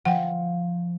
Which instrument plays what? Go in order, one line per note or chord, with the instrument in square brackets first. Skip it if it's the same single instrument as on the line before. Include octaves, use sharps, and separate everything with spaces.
[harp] F3 [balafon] F#5 G5